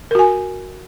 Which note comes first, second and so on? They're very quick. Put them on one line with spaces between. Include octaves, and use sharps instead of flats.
A#4 F#4 G#5